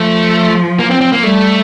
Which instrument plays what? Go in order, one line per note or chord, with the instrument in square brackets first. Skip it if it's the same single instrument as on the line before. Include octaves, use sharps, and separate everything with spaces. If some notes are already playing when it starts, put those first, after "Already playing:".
Already playing: [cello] F3 [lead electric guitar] A3
[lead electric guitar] A#3
C4
C4
A#3
[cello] G3 [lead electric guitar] A3